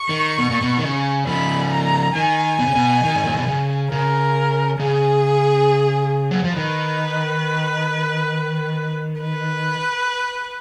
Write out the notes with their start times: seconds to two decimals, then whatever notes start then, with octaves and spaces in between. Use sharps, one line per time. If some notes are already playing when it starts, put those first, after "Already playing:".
Already playing: C#6
0.09 D#3
0.38 B2
0.50 A#2
0.62 B2
0.78 D#3
0.83 C#3
1.26 C#3 F3 B5
1.72 A#5
2.15 D#3 G#5
2.59 B2
2.67 C#3
2.75 B2
3.04 D#3
3.16 G#2
3.26 A#2
3.37 B2
3.48 C#3
3.91 C#3 A#4
4.80 C#3 G#4
6.31 F#3
6.44 F3
6.56 D#3 B4
9.21 B4